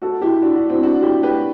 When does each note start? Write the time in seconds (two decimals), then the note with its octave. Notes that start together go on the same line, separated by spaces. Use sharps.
0.02 F#4 A4
0.22 E4 G4
0.42 D4 F#4
0.55 D4 F#4
0.69 C4 E4
0.83 D4 F#4
1.03 E4 G4
1.23 G4 B4